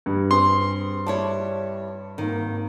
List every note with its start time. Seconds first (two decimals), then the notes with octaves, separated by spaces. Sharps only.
0.06 G2
0.31 C4 G#4 B4 C6
1.07 G3 E4 C#5 A5
2.18 G#1 D#3 A#3